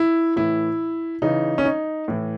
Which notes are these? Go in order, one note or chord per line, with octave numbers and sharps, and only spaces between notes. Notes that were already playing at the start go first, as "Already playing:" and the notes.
Already playing: E4
A2 E3 E4
C#3 E3 D#4
C#4
D#4
A2 E3